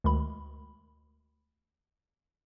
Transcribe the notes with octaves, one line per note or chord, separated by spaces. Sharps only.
D2 D#3 G#3 B5